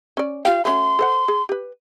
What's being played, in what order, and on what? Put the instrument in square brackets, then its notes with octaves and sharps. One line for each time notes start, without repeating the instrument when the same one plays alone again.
[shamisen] C#4 D5
[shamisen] F4 G4 G5 [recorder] F5
[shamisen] A3 C#4 F#4 [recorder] C6
[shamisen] A4 C5 F#5
G#4
G4 B4